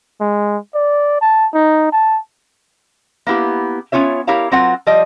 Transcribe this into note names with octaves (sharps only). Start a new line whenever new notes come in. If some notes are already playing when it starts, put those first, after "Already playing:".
G#3
D5
A5
D#4
A5
A#3 B3 E4 G4
B3 C#4 F4 C#5 E5
E4 G4 A#4 C#5 F5 A#5
F#3 C4 F4 A#4 F#5
F3 G3 D5 D#5